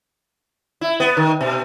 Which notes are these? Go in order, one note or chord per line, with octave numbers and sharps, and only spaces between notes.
E4
B3
D#3
B2